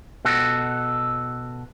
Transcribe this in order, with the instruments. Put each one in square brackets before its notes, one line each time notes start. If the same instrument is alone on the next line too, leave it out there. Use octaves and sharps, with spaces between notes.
[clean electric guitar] B2 F#4 A4